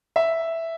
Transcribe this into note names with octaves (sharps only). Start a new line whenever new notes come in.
E5